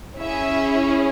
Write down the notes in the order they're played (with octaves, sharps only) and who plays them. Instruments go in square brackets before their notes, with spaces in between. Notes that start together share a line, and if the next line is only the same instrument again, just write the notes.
[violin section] C#4 E4 G#4 E5